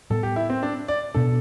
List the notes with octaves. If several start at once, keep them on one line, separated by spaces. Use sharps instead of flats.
A2 G3 B3 A4
G4
E4
C4
D4
D5
B2 B3 D4 A4